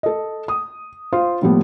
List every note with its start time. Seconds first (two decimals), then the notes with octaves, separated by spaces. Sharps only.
0.03 A4 D#5
0.48 D#6
1.13 F4 C5 F5
1.42 A2 F3 G3 A#3 B3